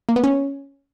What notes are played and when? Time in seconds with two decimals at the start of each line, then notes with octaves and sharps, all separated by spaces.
0.09 A#3
0.16 B3
0.24 C#4